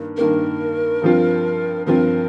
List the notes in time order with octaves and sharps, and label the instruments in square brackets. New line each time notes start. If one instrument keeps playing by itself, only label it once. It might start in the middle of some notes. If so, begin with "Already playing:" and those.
Already playing: [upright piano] G2 D#3 A#3
[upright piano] G2 D#3 A#3 [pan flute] A#4
[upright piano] G2 F3 C4 F4
[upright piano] G2 F3 C4 F4 [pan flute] A#4